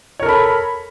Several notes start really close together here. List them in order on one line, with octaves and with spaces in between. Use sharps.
C#5 A#4 A4 B5